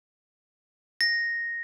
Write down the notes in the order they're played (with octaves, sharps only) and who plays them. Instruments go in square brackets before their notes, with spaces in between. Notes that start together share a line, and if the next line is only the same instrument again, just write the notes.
[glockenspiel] A#6